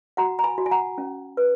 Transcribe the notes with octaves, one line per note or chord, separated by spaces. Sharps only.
F#4 F#5 A#5
A#5
G#5 B5
F#4
G#5
F#5 A#5
C#4
B4